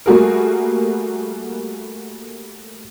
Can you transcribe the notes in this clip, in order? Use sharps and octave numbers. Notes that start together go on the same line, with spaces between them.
G3 A3 A#3 F#4 G#4 A#4